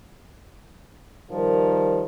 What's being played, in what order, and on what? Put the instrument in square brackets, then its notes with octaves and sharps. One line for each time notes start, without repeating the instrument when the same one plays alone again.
[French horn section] D#3 F3 G3 A#4